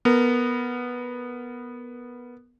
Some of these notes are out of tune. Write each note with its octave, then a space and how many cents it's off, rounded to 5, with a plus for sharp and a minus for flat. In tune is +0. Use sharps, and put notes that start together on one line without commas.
B3 -10 A#4 -15